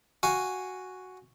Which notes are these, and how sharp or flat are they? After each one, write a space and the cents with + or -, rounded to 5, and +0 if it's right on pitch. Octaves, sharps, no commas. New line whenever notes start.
F#4 +0 F5 -5 G#5 -5